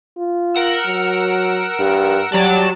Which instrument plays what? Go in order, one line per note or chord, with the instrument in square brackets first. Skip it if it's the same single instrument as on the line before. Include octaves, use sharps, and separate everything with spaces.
[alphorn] F4
[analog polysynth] A#4 F#5 E6
[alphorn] F#3
G2
[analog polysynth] F#3 D5 A5 [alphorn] G3